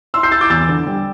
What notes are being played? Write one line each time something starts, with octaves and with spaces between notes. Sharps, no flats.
E4 C6 E6
G6 C7
E4 E6 A6
D6 G6
E2 E6 A6
D3
G3